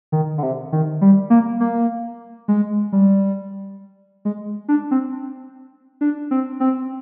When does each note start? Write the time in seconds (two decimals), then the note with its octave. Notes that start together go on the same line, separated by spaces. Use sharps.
0.12 D#3
0.38 D3
0.43 C3
0.72 D#3
1.01 G3
1.30 A#3
1.60 A#3
2.48 G#3
2.92 G3
4.25 G#3
4.68 D4
4.91 C4
6.01 D4
6.31 C4
6.60 C4